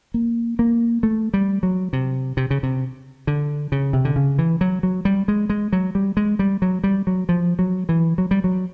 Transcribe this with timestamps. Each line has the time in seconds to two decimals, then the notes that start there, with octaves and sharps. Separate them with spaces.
0.14 A#3
0.59 A#3
1.03 A3
1.34 G3
1.63 F#3
1.93 C3
2.37 C3
2.50 C#3
2.63 C3
3.27 D3
3.72 C#3
3.93 C3
4.05 D3
4.16 C#3
4.38 E3
4.61 F#3
4.83 F#3
5.05 G3
5.28 G#3
5.50 G#3
5.73 F#3
5.95 G3
6.17 G#3
6.39 G3
6.62 F#3
6.84 G3
7.07 F#3
7.29 F3
7.59 F#3
7.89 E3
8.18 F#3
8.31 G3
8.44 F#3